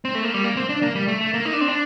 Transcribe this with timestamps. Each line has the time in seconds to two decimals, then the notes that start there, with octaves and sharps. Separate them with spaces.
0.05 C4
0.15 A3
0.24 A#3
0.34 G3
0.44 A#3
0.57 C4
0.69 D4
0.82 A#3
0.95 G3
1.08 A3
1.21 A3
1.34 A#3
1.46 D#4
1.53 D4
1.61 C4
1.68 D4